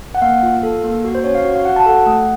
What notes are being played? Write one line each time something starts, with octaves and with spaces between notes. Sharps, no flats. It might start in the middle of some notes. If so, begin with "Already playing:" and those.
F#5
A#3 F5
F4
A4
A#3
F#4
C5
C#4 C#5
F5
F#4
F5
F#4 F#5
A5
A4 F#5
A3